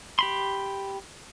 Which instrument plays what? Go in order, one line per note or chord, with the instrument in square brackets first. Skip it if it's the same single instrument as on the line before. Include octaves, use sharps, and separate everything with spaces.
[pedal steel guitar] G4 B5 C6